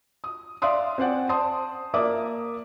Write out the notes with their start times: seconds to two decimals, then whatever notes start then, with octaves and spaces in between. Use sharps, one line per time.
0.24 D#6
0.62 D5 E5 F5 C6 D#6
0.98 C4 C#4 C5 D5 F#5
1.29 C5 A5 C6 D#6
1.94 A#3 D5 E5 D6 D#6